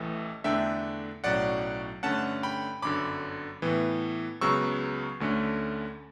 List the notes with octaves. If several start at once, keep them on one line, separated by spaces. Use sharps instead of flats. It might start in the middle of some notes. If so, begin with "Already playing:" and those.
Already playing: A1 A2 E3 A3
E2 D3 A3 D4 E5 G5
B1 A2 F#3 C#4 D5 F#5
G2 D3 A3 C#4 F#5 A5
G5 B5
G1 F#2 D3 B5 D6
A2 E3 B3
C#2 C#3 F#3 B3 C#6 E6
D2 D3 A3 C#4